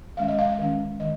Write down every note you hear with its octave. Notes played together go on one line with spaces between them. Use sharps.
D#3 G#3 C#4 F5
D#5
F5
F5
D#3 G#3 C#4
D#3 G#3 D#5